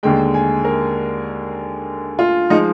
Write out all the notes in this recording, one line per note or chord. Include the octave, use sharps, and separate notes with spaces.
D#2 D3 G#3 G5
G#5
A#4
F4
F3 G#3 D#4